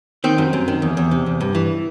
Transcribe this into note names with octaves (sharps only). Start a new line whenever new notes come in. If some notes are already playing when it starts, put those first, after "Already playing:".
D#3 C4
F#2
F#2
D#3
E2
E2
C3
E2
G2
E3